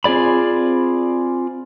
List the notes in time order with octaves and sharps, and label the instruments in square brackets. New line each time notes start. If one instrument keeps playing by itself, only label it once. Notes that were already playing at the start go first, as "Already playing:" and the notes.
[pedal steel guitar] C4 F4 G#4 D5 B5